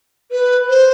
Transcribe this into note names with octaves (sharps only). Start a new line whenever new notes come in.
B4
C5